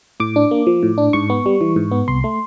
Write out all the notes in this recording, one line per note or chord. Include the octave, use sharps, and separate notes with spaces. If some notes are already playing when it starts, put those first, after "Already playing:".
A2 D6
D4
A#3
F3
A2
D4
G#2 C#6
B3
G3
E3
G#2
B3
C2 C6
A3